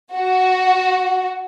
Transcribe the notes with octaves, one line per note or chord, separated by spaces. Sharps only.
F#4